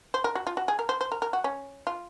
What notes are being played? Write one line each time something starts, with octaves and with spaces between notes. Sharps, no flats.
C5
A#4
F#4
F4
F#4
G#4
A#4
C5
C5
A#4
A#4
F#4
C#4
F4